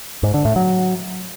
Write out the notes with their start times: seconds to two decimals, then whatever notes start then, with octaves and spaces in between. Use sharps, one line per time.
0.23 G#2
0.34 D3
0.45 A2
0.56 F#3